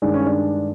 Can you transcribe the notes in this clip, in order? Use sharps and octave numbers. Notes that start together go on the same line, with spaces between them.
G2 D#3 G#3 D4
C#4
D4